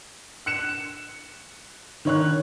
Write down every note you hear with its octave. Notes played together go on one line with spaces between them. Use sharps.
F#6 C#7 E7
D#3 C#5 F#6